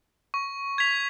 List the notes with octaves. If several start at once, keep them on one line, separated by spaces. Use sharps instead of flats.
C#6
G#6 B6 F7